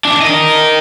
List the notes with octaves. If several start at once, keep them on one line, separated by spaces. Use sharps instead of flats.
E3 D4
A#4 D#5